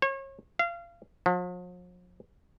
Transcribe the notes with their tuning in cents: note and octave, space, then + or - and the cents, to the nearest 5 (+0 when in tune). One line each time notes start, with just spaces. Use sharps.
C#5 -35
F5 -30
F3 +45